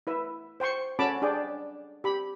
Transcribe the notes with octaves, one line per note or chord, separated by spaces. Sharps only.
E4 B4 E5
C5 G5 C6 C#6
C#4 F#4 A4 A5 B5 D6
D4 G#4 D5 G5
G4 B5